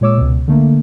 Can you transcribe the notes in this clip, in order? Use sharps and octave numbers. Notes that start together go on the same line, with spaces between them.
A#2 G#3 C#5 D6 E6
C#2 B2
D3 A3 A#3